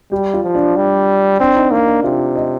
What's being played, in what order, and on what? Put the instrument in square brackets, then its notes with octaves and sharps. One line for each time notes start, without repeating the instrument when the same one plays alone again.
[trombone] G3 [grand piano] G4
[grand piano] F4
[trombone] F3
[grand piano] D4
[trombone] G3
[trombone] C4 [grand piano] D4
[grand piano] D#4
[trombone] A#3 [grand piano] D4
[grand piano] D4
[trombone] C3 [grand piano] F4
[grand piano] D#5